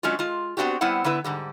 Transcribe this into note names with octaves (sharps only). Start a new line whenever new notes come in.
F#3 G#3 C#4 D4 F4
G#3 F4
B3 C4 D4 F#4 G4
G3 B3 C4 E4 F#5
D3 B3 E4 B4
G#2 D3 G3